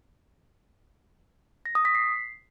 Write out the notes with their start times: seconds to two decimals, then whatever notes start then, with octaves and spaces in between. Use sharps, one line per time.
1.66 A#6
1.75 D#6
1.85 B6
1.95 C7